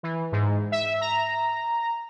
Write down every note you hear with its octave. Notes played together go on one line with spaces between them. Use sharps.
E3
G#2
E5
A#5